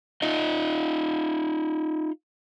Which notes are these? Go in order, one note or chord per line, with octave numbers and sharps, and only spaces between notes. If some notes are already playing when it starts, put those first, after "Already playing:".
D#4 F4 D#5